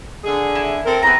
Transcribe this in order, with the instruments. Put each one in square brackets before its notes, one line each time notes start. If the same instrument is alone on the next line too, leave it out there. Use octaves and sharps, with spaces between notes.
[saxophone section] D3 G#4
[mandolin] E4
[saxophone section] C4 A4 A#4
[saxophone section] E2 C4 [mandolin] B4 A#5